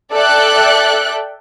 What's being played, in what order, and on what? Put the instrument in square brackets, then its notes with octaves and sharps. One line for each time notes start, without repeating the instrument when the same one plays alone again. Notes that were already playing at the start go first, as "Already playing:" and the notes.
[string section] A4 D5 E5 G5 F#6